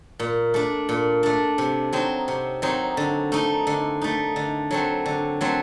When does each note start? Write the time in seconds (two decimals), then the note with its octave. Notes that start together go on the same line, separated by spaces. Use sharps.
0.19 A#2
0.54 A3 D4
0.89 A#2
1.23 A3 D4
1.58 C3
1.93 F#3 C4 D#4
2.28 C3
2.62 F#3 C4 D#4
2.97 D3
3.32 A3 D#4
3.67 D3
4.01 A3 D#4
4.36 D3
4.71 F#3 A3 C4
5.06 D3
5.41 F#3 A3 C4